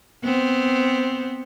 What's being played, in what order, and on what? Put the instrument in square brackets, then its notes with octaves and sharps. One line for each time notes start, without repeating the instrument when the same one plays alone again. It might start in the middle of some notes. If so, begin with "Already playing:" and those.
[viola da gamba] B3 C4